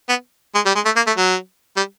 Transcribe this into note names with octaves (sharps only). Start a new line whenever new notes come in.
B3
G#3
G3
G#3
A3
A#3
A3
F#3
G3